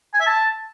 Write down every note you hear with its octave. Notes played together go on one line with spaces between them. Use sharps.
G#5
E5
A5